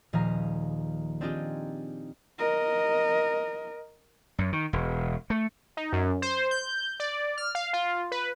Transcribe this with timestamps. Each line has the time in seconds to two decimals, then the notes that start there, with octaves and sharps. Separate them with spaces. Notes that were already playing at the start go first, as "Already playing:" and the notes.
0.13 D#1 F3 G#4 F5 A#5
1.21 C4 D4 D#4 F4 G4 G#4
2.39 A#4 D#5
4.38 F#2
4.53 D#3
4.73 E1
5.30 A3
5.77 D#4
5.93 F#2
6.22 C5
6.51 G6
7.00 D5
7.37 F6
7.55 F5
7.73 F4
8.12 B4